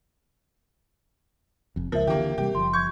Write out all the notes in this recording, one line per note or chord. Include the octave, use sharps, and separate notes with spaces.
F1 F2
C#2 F3 A#4 E5
D3 E3 A#3 G4
C3 F#3 G3 G4
F#1 F3 C6
C#6 G6 G#6